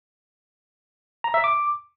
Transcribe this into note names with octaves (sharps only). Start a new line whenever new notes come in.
A#5
E5
D6